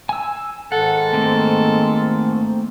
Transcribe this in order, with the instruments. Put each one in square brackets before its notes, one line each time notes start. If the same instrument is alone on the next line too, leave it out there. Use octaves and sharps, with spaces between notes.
[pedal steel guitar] G#5 E6
[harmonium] G#2 D#3 [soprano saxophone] A4 [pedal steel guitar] F#5
[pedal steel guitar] A3 A#3 C4